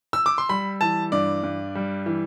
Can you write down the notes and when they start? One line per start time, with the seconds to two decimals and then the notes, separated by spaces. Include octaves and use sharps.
0.13 E6
0.26 D6
0.38 C6
0.49 G3 B5
0.81 E3 A5
1.12 G2 D5
1.43 G2
1.75 G3
2.06 E3